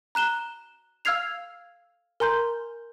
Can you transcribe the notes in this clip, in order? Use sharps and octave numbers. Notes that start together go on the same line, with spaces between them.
A#5 F#6 E7 G7
F5 E6 F6 G#6 C7 F7
A#4 G#5 A#5 C6 G6